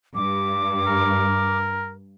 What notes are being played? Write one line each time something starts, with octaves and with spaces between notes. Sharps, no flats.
G2 D6
A#4